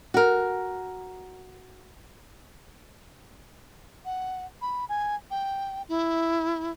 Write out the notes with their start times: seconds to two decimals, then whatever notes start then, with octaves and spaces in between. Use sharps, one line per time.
0.14 F#4 A#4
4.05 F#5
4.62 B5
4.89 G#5
5.30 G5
5.89 E4